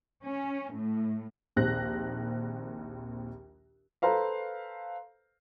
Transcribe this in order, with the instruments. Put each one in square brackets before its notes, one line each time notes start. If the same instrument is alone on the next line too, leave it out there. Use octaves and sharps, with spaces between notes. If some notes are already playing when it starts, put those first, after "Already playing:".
[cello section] C#4
A2
[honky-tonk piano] A#1 D#2 C4 F#6 A#6
[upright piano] A4 B4 C5 F5 A#5